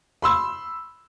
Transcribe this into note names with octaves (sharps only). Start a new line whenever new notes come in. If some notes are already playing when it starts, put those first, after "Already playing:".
B5 C6 E6